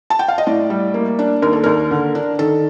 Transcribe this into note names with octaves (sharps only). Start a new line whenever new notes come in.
A5
G5
F5
D#5
A2 D5
G3
A#3
D4
D#2 A#4
A4
D#2 A#4
D3
D4
D#3 A4